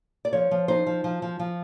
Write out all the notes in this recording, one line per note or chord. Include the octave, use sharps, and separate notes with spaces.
D5
F3 C#5
F3
D#4 C5
F3
F3
F3
F3